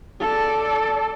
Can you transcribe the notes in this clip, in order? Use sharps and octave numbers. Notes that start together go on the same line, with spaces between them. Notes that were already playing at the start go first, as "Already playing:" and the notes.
A4 D5